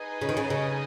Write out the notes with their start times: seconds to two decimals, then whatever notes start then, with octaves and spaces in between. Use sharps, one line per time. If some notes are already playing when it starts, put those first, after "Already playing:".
Already playing: D#4 G#4 B4 D#5 G#5
0.21 C#3
0.29 D#3
0.37 C#3
0.50 C#3